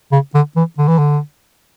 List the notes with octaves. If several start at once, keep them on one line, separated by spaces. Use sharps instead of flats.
C#3
D3
E3
D3
E3
D3